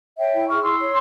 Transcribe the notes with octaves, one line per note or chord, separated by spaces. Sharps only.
C#5 E5 G5
E4
G#4 C#6 F6
E4 C6 E6
C#5